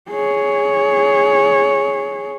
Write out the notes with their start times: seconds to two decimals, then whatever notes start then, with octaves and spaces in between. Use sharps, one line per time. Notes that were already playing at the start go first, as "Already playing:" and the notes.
0.11 G#4 C#5